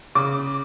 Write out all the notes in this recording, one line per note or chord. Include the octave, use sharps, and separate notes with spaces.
C#3 D6